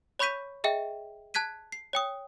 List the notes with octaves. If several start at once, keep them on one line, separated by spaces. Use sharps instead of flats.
C#5 B5 C#6 G6 B6 D#7
G#4 D#5 E5 G5
A5 F#6 G#6 B6 D#7
C7
C#5 G5 D#6